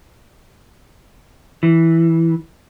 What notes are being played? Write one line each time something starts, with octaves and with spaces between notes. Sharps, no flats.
E3